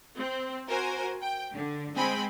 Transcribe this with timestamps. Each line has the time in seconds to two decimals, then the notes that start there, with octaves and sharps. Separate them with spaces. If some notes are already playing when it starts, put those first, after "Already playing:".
0.18 C4
0.68 F#4 A#4 C5 G#5
1.22 G5
1.54 D3
1.96 G#3 C4 G5 G#5 B5